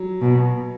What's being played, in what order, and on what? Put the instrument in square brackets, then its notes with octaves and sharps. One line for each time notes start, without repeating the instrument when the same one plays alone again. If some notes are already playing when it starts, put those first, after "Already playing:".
Already playing: [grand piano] F#3
[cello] B2